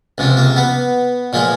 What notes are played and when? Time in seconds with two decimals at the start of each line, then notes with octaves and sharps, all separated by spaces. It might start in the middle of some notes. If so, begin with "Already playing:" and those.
0.18 C#2 C3 F3
0.37 A#3
0.57 B3
1.33 A#2 F3 G#3